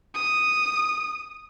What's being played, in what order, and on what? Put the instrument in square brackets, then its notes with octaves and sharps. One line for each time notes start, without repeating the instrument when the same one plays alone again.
[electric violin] D#6